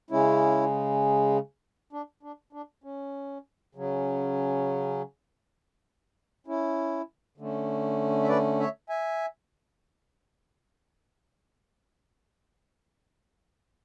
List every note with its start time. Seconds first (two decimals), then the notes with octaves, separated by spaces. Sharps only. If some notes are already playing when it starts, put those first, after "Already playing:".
0.10 C#3 G#3 C#4 E4
1.93 D4
2.23 D4
2.53 D4
2.84 C#4
3.75 C#3 F#3 C#4
6.47 C#4 E4
7.38 D3 A3 C#4
8.24 E5
8.29 B4 D5
8.60 C#5 E5
8.89 E5 G#5